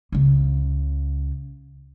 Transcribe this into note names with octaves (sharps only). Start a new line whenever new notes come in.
C#2 C#3